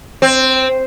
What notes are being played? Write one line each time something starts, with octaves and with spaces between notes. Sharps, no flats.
C4